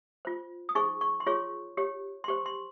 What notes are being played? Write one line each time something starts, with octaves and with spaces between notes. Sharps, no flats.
F4 C5
D#6
D#4 G#4 C5 C#6
C#6
C6
F4 G#4 C#5 C#6
G4 C#5
C6
G4 C5 C#6
C6